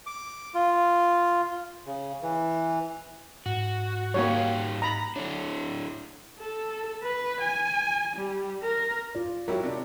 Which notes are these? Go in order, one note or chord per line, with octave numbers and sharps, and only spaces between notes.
D6
F4
C#3
E3
G#2 F#4
G3 A#3 D#4 F#4 G4 C#5
A#5 B5
D4 E4 A4 C#5
A4
B4
G#5
G3
A#4
F4 D5
F#3 E4 G4 A#4
C3 D4